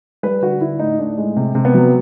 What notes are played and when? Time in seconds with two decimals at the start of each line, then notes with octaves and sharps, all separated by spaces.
0.23 G3 B4
0.42 D3 F#4
0.61 D3 E4
0.79 A2 D#4
0.98 A2 D4
1.18 G#3
1.36 C3
1.55 C3
1.65 B3
1.74 F#3